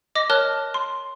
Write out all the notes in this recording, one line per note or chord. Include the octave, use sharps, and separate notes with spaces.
D#5 D6 A#6
A#4 C#5 A5 F6 F#6 G7
C6